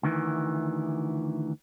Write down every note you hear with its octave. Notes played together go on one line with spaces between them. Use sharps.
D2 D#3 E3